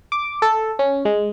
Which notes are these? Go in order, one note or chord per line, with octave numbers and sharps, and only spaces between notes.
D6
A4
C#4
G#3